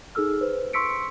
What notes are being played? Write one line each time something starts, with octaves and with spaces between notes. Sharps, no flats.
D#4 G#4 A4 E6 F6
B4 C5
C6 C#6 E6 B6 C#7 D7